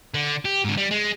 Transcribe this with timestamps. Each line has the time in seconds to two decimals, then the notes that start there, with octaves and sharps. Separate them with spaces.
0.14 D3
0.45 G4
0.64 G#2 D3
0.78 G3
0.91 G#3